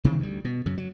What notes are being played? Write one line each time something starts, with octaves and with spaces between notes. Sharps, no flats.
C3 D#3 E3 C4
D2 G3
B2
F#2 C#3
F#3